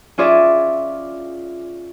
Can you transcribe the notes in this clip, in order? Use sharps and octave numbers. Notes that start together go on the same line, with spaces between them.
C#4 F4 G#4 D5 E5